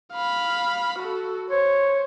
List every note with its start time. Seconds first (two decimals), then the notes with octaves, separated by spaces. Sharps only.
0.12 F5 B5
0.99 F#4 A4
1.51 C5 C#5